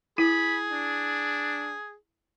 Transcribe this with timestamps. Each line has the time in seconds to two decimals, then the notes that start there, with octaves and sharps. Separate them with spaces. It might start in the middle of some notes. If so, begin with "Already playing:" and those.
0.18 E4 G#4 B5
0.71 D4